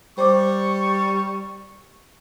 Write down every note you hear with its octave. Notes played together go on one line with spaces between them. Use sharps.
G3 C5 C#6 D6